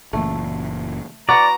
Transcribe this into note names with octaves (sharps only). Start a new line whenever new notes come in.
F#1 A#2 E3 A3
F#4 B4 D5 F#5 A#5